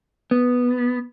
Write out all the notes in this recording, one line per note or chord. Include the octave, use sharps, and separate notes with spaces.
B3